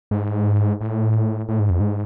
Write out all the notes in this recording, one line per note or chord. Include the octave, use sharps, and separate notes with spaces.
G#2
A2
A2
G#2
F2
G#2